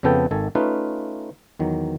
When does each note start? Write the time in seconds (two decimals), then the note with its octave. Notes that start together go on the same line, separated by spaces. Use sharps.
0.03 F2 C#3 F3 B3 A4 G5
0.31 G#1 D#3 A4 G#5
0.55 A3 C#4 D#4 F4 B4 F5
1.59 E2 D#3 F#3